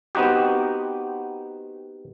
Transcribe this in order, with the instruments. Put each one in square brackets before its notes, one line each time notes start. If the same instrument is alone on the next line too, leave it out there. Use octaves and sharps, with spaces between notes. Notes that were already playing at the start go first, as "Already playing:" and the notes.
[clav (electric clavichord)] B3 C4 D#4 F#4 G4